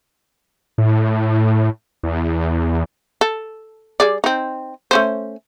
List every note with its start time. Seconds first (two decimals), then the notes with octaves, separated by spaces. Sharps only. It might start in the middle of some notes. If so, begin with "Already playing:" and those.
0.78 A2
2.03 E2
3.21 A4
4.00 G3 G#4 D5
4.24 C4 D#4
4.91 A3 C#4 C5